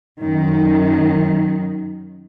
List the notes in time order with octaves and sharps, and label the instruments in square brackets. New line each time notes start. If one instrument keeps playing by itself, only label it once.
[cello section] F#2 D#3